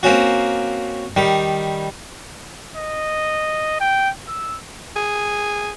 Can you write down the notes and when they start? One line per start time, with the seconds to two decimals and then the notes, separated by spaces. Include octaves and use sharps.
0.03 A#3 C4 C#4 F#4
1.17 D#3 G3
2.76 D#5
3.80 G5
4.28 E6
4.96 G#4